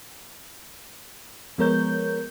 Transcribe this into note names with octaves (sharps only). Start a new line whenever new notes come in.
F3 G#3 B3 A#4 C#5 G6